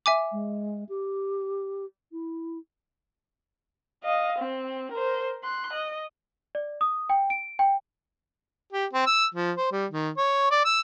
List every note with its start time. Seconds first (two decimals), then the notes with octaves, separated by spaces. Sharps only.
0.06 E5 G#5 D6
0.32 G#3
0.89 G4
2.12 E4
4.03 D#5 F5
4.39 C4
4.93 A#4 C5
5.43 C6 F#6
5.73 D#5
6.55 D5
6.81 D#6
7.10 G5
7.30 D7
7.59 G5
8.73 G4
8.93 C4
9.06 E6
9.35 F3
9.57 C5
9.72 G3
9.91 D#3
10.17 C#5
10.51 D5
10.65 E6